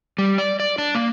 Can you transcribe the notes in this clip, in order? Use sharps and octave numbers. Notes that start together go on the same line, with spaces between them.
G3
D5
D5
D4
A#3